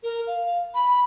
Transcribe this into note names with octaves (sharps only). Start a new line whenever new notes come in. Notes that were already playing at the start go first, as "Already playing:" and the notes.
A#4
F5
B5